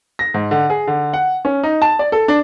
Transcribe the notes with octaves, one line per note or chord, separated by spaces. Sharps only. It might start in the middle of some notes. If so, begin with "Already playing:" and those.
A#6
G#2
D3
G#4
D3
F#5
C#4
D#4
A5
D5
A4
D4